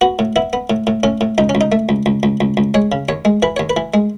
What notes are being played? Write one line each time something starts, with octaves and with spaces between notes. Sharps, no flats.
B3 F#4
A2
B3 E4
B3
A2
A2
A2 C#4
A2
C#2 D#4
C#4
C#2
D#4
A3
C#2
C#2
C#2
C#2
C#2
G#3 C#5
C#3
D#2 C#5
G#3
E3 B4
D#2 C#5
B4
E3
G#3